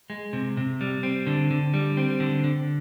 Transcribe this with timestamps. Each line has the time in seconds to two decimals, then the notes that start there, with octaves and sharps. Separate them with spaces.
0.10 G#3
0.33 C3
0.57 C3
0.81 G3
1.03 C4
1.27 D3
1.51 D3
1.74 G3
1.97 C4
2.20 D3
2.44 D3